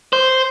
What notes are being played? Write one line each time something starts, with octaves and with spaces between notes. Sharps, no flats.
C5